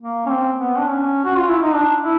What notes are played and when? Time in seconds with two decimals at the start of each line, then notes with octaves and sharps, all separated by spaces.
0.02 A#3
0.26 C#4
0.30 C4
0.59 B3
0.78 D4
0.87 C#4
1.25 F#4
1.37 F4
1.49 E4
1.61 D#4
1.74 D4
2.02 E4